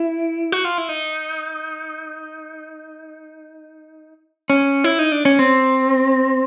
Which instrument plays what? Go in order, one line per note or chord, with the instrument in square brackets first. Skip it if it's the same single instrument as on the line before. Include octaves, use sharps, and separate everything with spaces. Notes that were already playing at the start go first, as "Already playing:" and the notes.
Already playing: [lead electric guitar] E4
F#4
F4
E4
D#4
C#4
E4
D#4
D4
C#4
C4